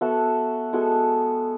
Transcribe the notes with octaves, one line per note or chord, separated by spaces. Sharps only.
B3 F#4 A4 E5
G#3 B3 F#4 A4